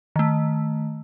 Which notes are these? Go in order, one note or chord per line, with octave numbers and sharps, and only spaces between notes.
D#3 A3